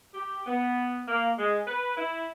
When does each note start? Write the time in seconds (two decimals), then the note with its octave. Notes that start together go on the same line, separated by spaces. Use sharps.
0.14 G4
0.46 B3
1.08 A#3
1.37 G#3
1.66 B4
1.97 E4